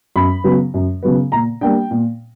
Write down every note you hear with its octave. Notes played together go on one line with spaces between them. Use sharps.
F#2 B5
C#3 F#3 B3
F#2
C#3 F#3 B3
A#2 A#5
G3 A#3 D4 G5
A#2